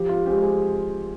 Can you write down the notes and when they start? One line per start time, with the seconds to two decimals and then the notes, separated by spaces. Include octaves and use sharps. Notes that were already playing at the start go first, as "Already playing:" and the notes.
Already playing: F3 G4
0.09 F4
0.26 G#3 C4 G4
0.43 G#4